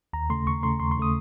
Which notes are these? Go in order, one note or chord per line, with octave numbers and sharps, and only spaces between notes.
D#2 A#5
C#3 A3 C6
D#2 C#6
C#3 A3 C6
D#2 C6
C6
C#3 A3 D#6